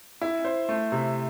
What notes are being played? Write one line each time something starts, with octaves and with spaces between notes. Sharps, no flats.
E4
C5
A3
C3